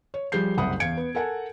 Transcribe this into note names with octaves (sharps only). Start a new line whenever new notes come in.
C#5
F3 G3 G#4 G6 C7
F#1 C2 F#5 B5 D#6
E2 F5 G#6 C#7 D7
B3
A4 A#4 F#5 G#5 A5